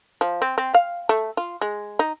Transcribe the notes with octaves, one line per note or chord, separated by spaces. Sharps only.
F3
C4
C4
F5
A3
F4
G#3
D#4